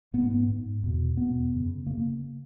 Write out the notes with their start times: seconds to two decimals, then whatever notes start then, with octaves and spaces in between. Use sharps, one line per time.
0.14 G#2 B3
0.30 B3
0.48 G#2
0.83 E2 B2
1.17 E2 B2 B3
1.52 F#2 C#3
1.87 C#3 A#3